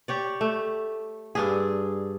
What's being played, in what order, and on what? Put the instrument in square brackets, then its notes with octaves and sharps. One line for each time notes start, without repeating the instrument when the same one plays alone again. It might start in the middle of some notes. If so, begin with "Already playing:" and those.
[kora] G4 C#5 D5
A3
G2 D4 G#4